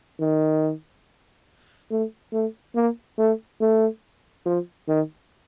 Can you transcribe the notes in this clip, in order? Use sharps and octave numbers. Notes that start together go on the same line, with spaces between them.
D#3
A3
A3
A#3
A3
A3
F3
D#3